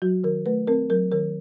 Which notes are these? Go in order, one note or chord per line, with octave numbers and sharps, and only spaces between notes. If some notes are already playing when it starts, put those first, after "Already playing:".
F#3 F#4
D#3 A#4
A3 B4
C4 A#4
F#3 A#4
D#3 A#4